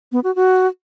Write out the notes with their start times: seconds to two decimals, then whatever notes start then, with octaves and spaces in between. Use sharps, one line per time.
0.12 B3
0.24 F#4
0.36 F#4